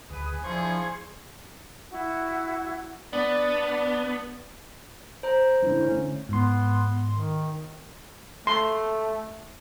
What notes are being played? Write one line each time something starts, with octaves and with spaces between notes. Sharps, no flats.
D2 G#4 B4 D#6
F3 D4 E4 G#4 C6 C#6 G#6
E4 F#4 F#5
B3 D4 D5
C5 A#5
D3 E3
D3 A3 C#4
G#2 B3 C6
D#3
A3 C6